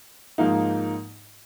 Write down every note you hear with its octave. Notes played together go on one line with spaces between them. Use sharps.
G#2 F3 A#3 D#4